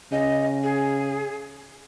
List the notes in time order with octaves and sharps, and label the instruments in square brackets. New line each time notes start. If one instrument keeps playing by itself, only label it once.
[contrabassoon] C#3 [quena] D#5
[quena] G#4